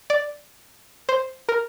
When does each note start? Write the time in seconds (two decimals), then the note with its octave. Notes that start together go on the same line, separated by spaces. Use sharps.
0.10 D5
1.09 C5
1.49 A#4